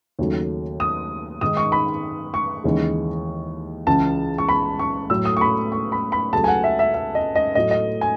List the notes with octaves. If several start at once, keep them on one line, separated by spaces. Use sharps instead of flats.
D#2 C#3 F#3 A3
D#6
G#2 D#3 G#3 D#6
C#6
B5
C#6
D#2 C#3 E3 G#3
C#2 C#3 E3 A5
C#6
B5
C#6
A2 F#3 A3 E6
D#6
C#6
B5
C#6
B5
B5
C#2 C#3 F#3 A3 A5
G#5
F#5
E5
E5
E5
D#5
D#5
A2 F#3 A3 D#5
D#5
G#5